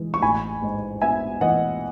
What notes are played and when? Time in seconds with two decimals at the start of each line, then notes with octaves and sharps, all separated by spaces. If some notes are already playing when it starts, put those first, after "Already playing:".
Already playing: E3 G#3
0.14 C#6
0.22 A1 G#5 B5
0.63 G#2
1.02 B3 E5 G#5
1.41 E3 D#5 F#5